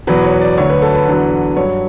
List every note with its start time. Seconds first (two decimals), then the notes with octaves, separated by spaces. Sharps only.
0.07 E2 B2 F#3 B4
0.24 C#5
0.41 D5
0.57 D2 D3 F#3 C#5
0.70 B4
0.82 A4
0.95 B4
1.08 E2 D3 F#3
1.57 G2 F#3 C#5